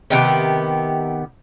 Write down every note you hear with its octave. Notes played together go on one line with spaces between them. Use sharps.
C3 D#3 B3 G4